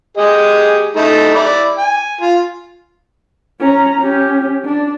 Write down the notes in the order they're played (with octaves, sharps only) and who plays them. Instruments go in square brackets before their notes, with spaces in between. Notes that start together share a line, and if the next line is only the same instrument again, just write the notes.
[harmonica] G4 G#4 D#5
A3 D#4 E4
E4 D5
G#5
F4
[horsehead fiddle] C#4 A#5
C#4 G4
D4